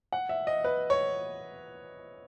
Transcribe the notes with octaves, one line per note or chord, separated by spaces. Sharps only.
F#5
E5
D#5
B4
C#5